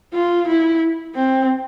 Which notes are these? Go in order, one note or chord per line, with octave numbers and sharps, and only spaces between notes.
F4
E4
C4